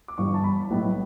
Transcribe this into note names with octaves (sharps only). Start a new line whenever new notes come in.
D6
G1 G2 E3 G3 C#6
A5
B5
B1 A2 G3 B3 E4